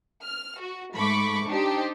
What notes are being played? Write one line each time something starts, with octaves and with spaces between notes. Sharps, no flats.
F6
F#4
G#2 A3 B5 C#6 D6
D4 D#4 G4 C5